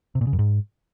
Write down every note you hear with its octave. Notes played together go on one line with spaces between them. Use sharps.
C3
A#2
C#3
F#2
G#2